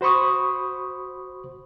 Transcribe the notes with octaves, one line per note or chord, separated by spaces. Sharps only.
F#4 C5 B5 C#6 D#6